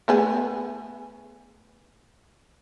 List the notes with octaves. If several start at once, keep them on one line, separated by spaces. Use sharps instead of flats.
A3 B3 G#4